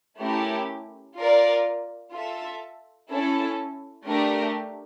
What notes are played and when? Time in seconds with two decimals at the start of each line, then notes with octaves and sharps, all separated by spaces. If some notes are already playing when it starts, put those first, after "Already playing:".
0.18 A3 C#4 E4 G4 A#4
1.16 F4 A#4 D5
2.13 F4 A4 E5
3.10 C#4 E4 A4
4.07 A3 D4 G4 A#4